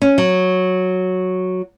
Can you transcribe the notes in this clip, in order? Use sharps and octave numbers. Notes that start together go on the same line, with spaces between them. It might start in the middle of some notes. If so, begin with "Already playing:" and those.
C#4
F#3